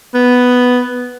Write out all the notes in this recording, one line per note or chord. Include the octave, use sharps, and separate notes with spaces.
B3